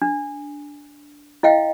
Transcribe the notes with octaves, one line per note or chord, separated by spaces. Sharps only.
D4
E4 D#5 F5 G5